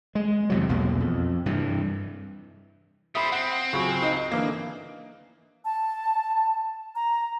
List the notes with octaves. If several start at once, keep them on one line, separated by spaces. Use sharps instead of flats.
G#3
E2 C3 F#3
B1 E2 B2 A#3
F2
G2 C3 E3
G3 C5 E5 B5 D#6
C4 F#5
C#2 F#3 G#5 C#6
D#4
D3 E3 A#3
A5
A#5